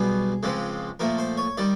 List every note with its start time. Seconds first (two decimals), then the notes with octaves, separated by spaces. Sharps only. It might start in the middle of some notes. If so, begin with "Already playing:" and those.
Already playing: B1 B2 G3 B3 G#4
0.43 C#2 C#3 F3 G#3 C4
1.00 A#2 F3 A3 A#4
1.18 C5
1.37 C#5
1.57 D#3 G3 D5